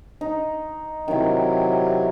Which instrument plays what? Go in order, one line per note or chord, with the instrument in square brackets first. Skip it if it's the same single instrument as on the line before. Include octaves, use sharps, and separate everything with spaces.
[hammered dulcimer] D#4
[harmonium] C3 F#3 [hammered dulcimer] D#3 E4